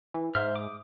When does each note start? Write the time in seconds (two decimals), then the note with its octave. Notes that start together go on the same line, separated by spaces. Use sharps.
0.14 E3
0.35 G#2 C5 E5 F6
0.56 D6 D#6